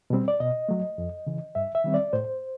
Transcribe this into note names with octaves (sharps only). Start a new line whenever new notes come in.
B2 G3 C4
D5
B2 D#5
F#3 A3
F2
C#3 E3
G2 E5
E5
D#3 G3 C4
D5
A2 C5